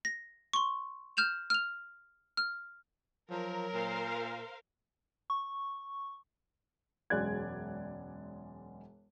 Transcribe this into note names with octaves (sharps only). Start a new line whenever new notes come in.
A#6
C6 C#6
F6 G6 E7 F7
F6 F7
F6
F3 F#3 A#4
A#2 C5 F5
C#6
E1 F#2 G#3 D5 F#6 G#6